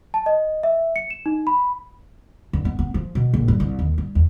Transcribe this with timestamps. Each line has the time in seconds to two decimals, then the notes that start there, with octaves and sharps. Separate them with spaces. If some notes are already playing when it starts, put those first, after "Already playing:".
0.14 A5
0.26 D#5
0.63 E5
0.96 C#7
1.10 E7
1.26 D#4
1.47 B5
2.53 G2
2.65 B3
2.79 B3
2.94 F3
3.15 B2
3.34 A#1
3.48 G2
3.60 C2
3.79 D#2
3.98 G2
4.15 E2